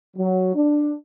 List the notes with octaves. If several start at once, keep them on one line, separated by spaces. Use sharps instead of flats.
F#3
D4